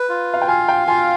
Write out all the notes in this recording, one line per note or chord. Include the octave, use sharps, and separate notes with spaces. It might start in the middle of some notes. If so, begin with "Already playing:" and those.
Already playing: B4
F4
F5
G5
F5 G#5
G5
F4 G#5